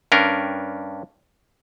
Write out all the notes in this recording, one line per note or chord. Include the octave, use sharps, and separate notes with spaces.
G2 C#4 D4 A#4